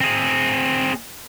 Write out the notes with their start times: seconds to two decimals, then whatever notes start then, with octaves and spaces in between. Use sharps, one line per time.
0.01 C4 G#4